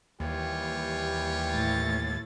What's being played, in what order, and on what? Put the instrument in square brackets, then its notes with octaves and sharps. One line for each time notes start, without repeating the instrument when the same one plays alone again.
[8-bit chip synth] D#2 [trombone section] E3 G3 G4 [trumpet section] F4 C#5
[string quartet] A2 A6